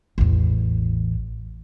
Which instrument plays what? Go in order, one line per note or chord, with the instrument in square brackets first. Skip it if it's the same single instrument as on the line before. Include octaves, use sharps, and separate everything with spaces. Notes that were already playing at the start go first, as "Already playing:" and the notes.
[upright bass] A1 E2